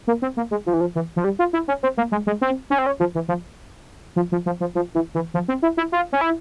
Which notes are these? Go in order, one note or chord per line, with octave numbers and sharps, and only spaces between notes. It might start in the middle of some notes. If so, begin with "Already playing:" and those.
A#3
C4
A#3
G#3
F3
E3
F3
E3
F3
G3
F4
E4
C#4
C4
A#3
G#3
G#3
C4
C#4
C4
C#4
F3
E3
F3
F3
F3
F3
F3
F3
E3
E3
F3
C4
E4
E4
F4
C#4
E4